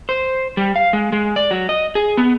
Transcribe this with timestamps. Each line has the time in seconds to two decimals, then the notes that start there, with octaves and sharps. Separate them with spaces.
0.09 C5
0.57 G3
0.76 F5
0.93 G#3
1.12 G#3
1.36 D5
1.51 F#3
1.69 D#5
1.95 G#4
2.17 B3